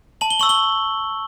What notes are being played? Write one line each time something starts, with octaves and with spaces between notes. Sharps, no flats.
A5 F#7
G7
C#6 E6 F#7
G7